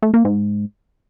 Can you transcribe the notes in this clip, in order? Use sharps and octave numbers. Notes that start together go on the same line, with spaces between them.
A3
A#3
G#2